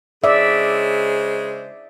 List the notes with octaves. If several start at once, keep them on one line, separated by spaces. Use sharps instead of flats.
C#3 G#3 C5 D5 E5